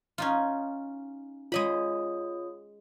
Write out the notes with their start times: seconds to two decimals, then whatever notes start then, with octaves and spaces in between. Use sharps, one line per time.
0.18 C#4 D#4 F4
1.52 G#3 F4 C#5 D#5 B5 D#6